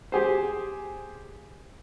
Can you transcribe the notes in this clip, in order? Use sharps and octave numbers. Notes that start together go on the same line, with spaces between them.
G4 G#4 C5